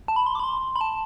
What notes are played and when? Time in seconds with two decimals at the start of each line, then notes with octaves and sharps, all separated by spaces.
0.08 A5
0.16 B5
0.26 C6
0.35 D6
0.40 B5
0.44 C6
0.76 B5
0.81 A5